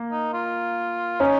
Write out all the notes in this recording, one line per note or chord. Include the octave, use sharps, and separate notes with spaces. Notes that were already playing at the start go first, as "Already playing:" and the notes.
Already playing: A#3
D#4
F4
C#4 D#4